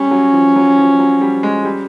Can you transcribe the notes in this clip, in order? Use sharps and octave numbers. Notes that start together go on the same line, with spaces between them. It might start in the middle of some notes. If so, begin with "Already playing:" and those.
Already playing: G3 C#4
F#3
F3
F#3
F3
F#3
G3
G#3
G3